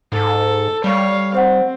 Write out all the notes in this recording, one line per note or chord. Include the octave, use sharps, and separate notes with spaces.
G#2 A4
G3 C#5 F5
C4 C5 F#5